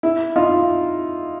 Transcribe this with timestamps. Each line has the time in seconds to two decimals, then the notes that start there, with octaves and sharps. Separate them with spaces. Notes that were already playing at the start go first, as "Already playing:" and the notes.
0.03 E4
0.36 D#4 F4